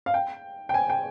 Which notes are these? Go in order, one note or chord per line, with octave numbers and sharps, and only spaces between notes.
F5
G5
G5
G#5
G5